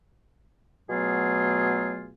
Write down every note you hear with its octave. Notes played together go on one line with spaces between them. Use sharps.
B2 F#3 A3 B3 F4 G#4